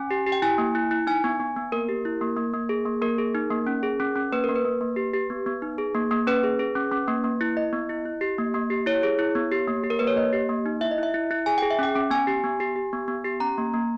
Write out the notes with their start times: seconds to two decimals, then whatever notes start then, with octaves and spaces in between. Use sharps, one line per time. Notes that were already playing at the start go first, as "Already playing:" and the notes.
Already playing: C#4 G#5
0.11 G4
0.27 G4
0.32 G5
0.42 E4 G#5
0.58 A#3
0.75 E4
0.91 E4
1.07 D#4 G#5
1.24 B3
1.40 B3
1.56 B3
1.72 A#3 A#4
1.89 G4
2.05 E4
2.21 A#3
2.37 A#3
2.53 A#3
2.69 G#4
2.85 A#3
3.02 A#3 A#4
3.18 G#4
3.35 D#4
3.50 A#3
3.67 C#4
3.83 G#4
4.00 C#4
4.15 C#4
4.32 A#3 B4
4.44 A#3 A#4
4.55 B4
4.65 A#3
4.81 A#3
4.96 G4
5.14 G4
5.30 B3
5.46 B3
5.62 D#4
5.78 G#4
5.95 A#3
6.11 A#3
6.27 C#4 B4
6.44 G#4
6.59 G#4
6.75 C#4
6.92 C#4
7.08 A#3
7.24 A#3
7.41 E4
7.57 E4 D#5
7.73 B3
7.89 E4
8.05 E4
8.21 G4
8.38 A#3
8.54 A#3
8.70 G4
8.86 E4 C#5
9.03 G#4
9.19 E4
9.35 B3
9.52 G4
9.68 A#3
9.84 G4
9.90 A#4
9.99 A#3 B4
10.07 C#5
10.16 A#3 D#5
10.33 G4
10.49 A#3
10.66 D#4
10.81 E4 E5
10.91 D#5
10.98 E4
11.03 E5
11.14 E4
11.31 E4
11.46 G#4 G#5
11.58 G#4 G5
11.71 E5
11.79 C#4 G5
11.95 C#4
12.11 B3 G#5
12.27 G4
12.44 B3
12.60 G4
12.76 G4
12.93 B3
13.08 B3
13.24 G4
13.40 C#4 A#5
13.58 A#3
13.74 A#3